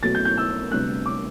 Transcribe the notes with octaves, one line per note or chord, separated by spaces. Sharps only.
B2 F#3 A3 A6
G6
G6
E6
D2 C3 G3 B3 F#6
D6